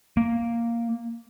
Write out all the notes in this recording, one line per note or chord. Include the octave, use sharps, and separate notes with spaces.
A#3